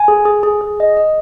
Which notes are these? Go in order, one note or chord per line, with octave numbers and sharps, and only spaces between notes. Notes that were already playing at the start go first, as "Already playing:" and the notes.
Already playing: G#5
G#4
G#4
G#4
G#4
D#5
D#5